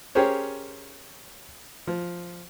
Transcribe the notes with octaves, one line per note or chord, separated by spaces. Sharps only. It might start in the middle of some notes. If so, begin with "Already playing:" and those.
C#4 G4 G#4 A#4 C5 C#5
F3